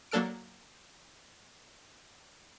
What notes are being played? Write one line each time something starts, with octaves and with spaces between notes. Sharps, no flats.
F#3 A#3 D4 A4 F6 D7